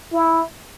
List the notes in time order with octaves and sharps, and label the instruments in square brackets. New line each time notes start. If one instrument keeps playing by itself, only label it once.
[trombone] E4